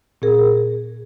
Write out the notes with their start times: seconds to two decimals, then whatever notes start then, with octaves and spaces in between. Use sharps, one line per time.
0.22 A#2 C4 G#4 A#4